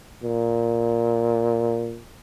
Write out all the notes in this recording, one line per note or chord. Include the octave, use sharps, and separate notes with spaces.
A#2